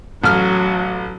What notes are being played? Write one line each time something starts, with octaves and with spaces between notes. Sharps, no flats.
A1 F#3 F6